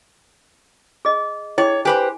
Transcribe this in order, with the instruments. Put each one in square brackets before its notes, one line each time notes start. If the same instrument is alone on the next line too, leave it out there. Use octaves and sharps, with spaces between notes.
[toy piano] G#4 D#5
[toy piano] E4 G#4 G5 [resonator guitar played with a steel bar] C#5
[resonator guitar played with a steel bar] G4 B4 C5 [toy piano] G#5